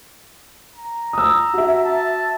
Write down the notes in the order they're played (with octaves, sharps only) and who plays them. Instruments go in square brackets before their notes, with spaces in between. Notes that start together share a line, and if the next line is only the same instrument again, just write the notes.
[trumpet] A#5
[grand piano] D#6 E6
[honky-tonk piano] F#4 E5
[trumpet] A5